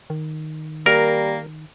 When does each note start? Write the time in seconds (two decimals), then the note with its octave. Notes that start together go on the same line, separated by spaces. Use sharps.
0.10 D#3
0.86 G3 A#3 A#4